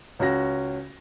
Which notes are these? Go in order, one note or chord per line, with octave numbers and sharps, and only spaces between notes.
C#2 C#4 F#4 A#6